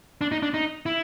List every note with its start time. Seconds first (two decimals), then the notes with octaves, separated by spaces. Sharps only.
0.21 D4
0.32 D#4
0.42 D4
0.54 D#4
0.86 E4